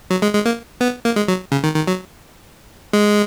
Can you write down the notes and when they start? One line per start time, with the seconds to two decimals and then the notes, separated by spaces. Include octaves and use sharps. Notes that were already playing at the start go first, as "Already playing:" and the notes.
0.10 F#3
0.22 G#3
0.34 G#3
0.45 A#3
0.81 B3
1.05 A#3
1.16 G#3
1.28 F#3
1.52 C#3
1.64 D#3
1.76 D#3
1.87 F#3
2.93 G#3